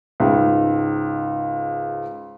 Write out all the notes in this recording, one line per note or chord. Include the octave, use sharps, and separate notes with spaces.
C#2 G#2